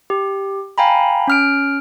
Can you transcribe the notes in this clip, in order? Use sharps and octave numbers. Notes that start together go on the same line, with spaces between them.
G4
F5 G5 G#5 A#5 B5
C#4 F6 D7